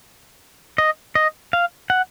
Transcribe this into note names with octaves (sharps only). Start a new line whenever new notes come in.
D#5
D#5
F5
F#5